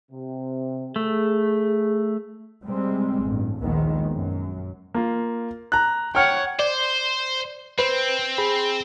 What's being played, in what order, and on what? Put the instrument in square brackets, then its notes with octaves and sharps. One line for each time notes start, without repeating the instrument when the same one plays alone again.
[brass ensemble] C3
[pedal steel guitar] A3 [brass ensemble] G#4
[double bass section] C3 G3 G#3 C4
A1 G2
A#1 D#2 D#3 G#3 B3
F#2
[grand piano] A#3 F4
A#5 F#6
[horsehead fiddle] C#5 F#5 [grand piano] G5 F6
[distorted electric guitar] C5 [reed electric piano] D5
[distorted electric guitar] C4 [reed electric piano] B4 C5
[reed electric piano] G#4 B5